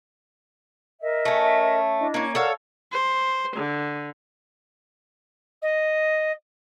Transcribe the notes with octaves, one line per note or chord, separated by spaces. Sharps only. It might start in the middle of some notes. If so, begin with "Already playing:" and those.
A#4 D#5 E5
A3 C#4
D4 E4 D#5
A#3 C#4
A4 A#4 C#5 D5 F5 F#5
C5
D3
D#5